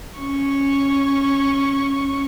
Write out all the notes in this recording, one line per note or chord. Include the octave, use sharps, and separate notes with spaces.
C#4 C#6